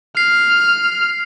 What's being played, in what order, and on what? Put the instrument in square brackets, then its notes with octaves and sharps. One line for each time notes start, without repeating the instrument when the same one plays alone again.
[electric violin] F6 [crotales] C7